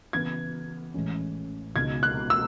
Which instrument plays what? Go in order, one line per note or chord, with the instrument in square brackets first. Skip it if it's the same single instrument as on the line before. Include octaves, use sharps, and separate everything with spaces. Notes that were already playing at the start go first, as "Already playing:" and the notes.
[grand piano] C#3 E3 B3 [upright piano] G#6
[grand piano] A1 A2 E3 G#3 C#4
[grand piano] C#2 B2 G#3 D#4 [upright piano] G#6
[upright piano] F#6
E6